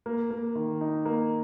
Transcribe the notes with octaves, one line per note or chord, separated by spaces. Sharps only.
A#3
A#3
D#3
D#4
A#3